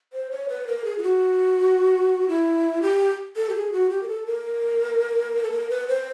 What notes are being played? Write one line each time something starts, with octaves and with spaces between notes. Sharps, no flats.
C5
C#5
B4
A#4
G#4
F4
F#4
E4
G4
A4
G4
G#4
F#4
G4
A#4
A4
A#4
A4
A#4
B4
C5